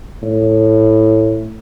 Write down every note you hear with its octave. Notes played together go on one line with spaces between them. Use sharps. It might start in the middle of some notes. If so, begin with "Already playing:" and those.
A2